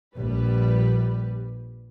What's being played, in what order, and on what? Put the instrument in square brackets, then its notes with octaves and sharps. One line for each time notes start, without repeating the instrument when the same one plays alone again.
[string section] A#1 G3 B4